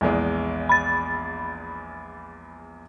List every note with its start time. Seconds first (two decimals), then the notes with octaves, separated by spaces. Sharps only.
0.01 A#1 E2 G#3
0.69 B5 A6